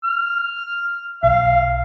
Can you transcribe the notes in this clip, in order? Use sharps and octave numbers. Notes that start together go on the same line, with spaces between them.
F6
B1 F5